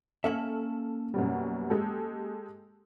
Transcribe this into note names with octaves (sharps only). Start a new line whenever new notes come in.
A#3 C#4 A4 E5 F6 F#7
F#2 B2 G3
G#3 G4 A4